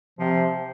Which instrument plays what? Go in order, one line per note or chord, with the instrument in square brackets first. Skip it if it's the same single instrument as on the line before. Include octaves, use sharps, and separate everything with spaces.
[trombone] C3 [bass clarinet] F3